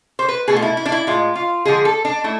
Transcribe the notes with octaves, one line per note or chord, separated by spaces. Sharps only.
C5
B4
B2 A3 G#4
F4
E4
E4
D4
E4
A2 G#3 F4
F4
D3 F3 G#3 G#4
A4
D4
A3 E4